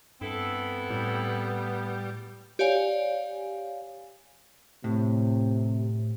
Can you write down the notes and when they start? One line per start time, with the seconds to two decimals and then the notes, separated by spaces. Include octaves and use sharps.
0.21 G2 B3 C4 E4 A4
0.90 A2 G3
2.59 G4 C#5 D5 F5 G#5
4.84 A2 C3